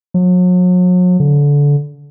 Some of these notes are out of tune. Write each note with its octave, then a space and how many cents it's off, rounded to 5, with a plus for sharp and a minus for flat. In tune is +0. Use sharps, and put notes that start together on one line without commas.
F#3 -40
D3 -25